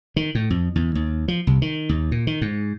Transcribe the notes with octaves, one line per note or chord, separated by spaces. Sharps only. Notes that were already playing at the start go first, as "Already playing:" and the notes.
D#3
A2
F2
E2
D#2
F3
C2
D#3
D#2
A#2
D#3
G#2